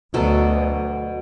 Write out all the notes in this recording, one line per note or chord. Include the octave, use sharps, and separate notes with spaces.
D2 B2 F#3 A4